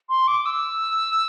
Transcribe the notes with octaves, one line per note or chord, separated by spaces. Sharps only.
C6
D6
E6